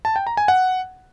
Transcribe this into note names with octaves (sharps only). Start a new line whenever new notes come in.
A5
G5
A#5
G#5
F#5